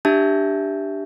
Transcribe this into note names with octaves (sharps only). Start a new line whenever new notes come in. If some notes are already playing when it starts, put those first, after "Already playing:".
D4 G4 E5 A5 G6